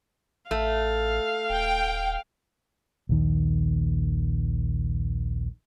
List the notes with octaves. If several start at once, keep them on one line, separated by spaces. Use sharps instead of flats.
A1 A3 F5
D#1 G5
A#1 D#2 D#3